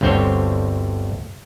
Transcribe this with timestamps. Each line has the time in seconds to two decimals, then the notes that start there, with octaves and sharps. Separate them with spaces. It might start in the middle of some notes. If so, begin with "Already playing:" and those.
0.01 G1 D2 D3 C4 C5 C#5